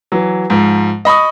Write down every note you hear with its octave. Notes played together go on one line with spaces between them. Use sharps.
E3 F#3
G#2 F3
D#5 B5 C#6 D#6